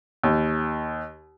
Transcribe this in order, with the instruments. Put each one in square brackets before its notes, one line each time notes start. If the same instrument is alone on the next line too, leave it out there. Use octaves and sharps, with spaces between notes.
[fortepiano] D#2